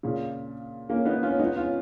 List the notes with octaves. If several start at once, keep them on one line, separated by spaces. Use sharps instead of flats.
A#2 C#3
A#3 C#4
B3 D#4
C#4 F4
B3 D#4
C#4 F4